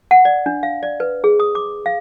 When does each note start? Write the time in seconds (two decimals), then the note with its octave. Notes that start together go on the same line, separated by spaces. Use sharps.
0.11 F#5
0.25 D5
0.46 D4
0.63 F5
0.83 D5
1.00 B4
1.24 G#4
1.40 D#6
1.55 D6
1.86 F5